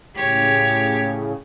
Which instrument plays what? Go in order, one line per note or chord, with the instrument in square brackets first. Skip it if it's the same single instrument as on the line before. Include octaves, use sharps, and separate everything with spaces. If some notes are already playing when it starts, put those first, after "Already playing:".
[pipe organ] A2 C#3 [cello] G4 C#5